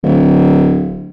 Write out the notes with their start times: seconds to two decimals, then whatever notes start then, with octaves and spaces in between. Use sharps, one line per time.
0.03 D1